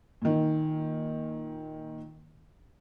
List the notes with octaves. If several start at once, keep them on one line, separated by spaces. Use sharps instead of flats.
A#2 D#3